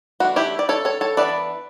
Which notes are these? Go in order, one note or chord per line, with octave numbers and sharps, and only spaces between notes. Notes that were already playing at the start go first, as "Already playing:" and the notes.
E3 A3 D4 F#4
E4 G4
D5
A4 C#5
A4 C#5
A4 C#5
E3 B3 D4 B4 D5